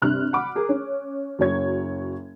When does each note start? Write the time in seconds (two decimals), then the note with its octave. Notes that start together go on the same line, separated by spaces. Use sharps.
0.02 G2 C3 F6 F#6
0.33 F#5 B5 D6
0.55 G#4 A#4
0.69 C#4
1.39 F#1 F#3 C#5 G#6